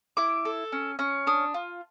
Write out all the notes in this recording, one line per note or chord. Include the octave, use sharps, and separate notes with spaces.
E4 D6
A4
C#4
C#4
D4 D#6
F4